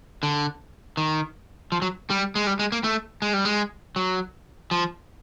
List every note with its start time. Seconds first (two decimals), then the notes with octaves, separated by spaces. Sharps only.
0.23 D3
0.97 D#3
1.72 F3
1.82 F#3
2.10 G3
2.35 G#3
2.47 G3
2.59 G#3
2.72 A#3
2.84 A3
3.22 G#3
3.33 G3
3.45 G#3
3.96 F#3
4.71 F3